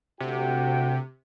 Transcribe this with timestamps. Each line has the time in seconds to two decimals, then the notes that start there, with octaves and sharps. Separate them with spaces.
0.20 D2 C3 F#4 G5